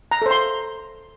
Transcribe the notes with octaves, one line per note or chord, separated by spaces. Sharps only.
A#5
A4 C5
C6